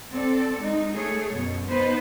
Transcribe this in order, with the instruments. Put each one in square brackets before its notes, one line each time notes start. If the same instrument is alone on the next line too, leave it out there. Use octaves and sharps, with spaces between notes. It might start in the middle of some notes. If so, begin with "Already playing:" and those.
[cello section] C4 A4 D5
G#3 D#4
A3 G#4 C#5
F#2 B2
B3 D#4 B4 C5